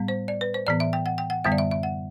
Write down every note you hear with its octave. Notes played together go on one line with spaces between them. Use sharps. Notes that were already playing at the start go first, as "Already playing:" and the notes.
Already playing: A2 G3 B3
C5
D5
B4
C5
A2 E3 B3 D5
E5
G5
F#5
G5
F#5
F#2 D3 G3 B3 E5
D5
E5
E5
F#5